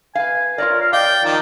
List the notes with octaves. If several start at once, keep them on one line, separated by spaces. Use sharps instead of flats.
B4 F5 G#5
F4 A#4 C#5 D5
F5
D5 D#5 F5 G5
D#3 F3